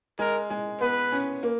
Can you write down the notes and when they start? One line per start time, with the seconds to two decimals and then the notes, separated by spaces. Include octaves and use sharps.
0.19 G#3 A#4
0.50 G#3
0.81 B3 B4
1.12 C#4
1.43 A#3